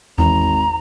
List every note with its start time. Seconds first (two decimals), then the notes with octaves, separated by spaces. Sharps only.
0.18 G#1 E2 A#5